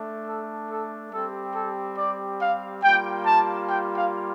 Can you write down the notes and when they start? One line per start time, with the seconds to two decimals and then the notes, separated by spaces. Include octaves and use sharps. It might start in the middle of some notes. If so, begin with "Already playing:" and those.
Already playing: A3 D4
0.27 A4
0.70 A4
1.12 G3 C4 G4 A4
1.55 A4
1.97 D5
2.41 F5
2.83 G3 A#3 F4 G5
3.25 A5
3.69 G5
3.97 F5